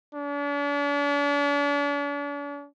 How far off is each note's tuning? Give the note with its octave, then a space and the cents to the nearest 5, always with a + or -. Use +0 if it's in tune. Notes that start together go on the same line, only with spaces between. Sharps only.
D4 -45